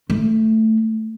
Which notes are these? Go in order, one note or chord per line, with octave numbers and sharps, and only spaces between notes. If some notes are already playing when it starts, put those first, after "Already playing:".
A3